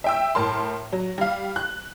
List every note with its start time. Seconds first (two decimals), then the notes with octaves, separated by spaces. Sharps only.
0.04 E5 G5 E6
0.35 A2 A#4 A5 C6
0.93 F#3
1.18 G3 F5
1.56 F#6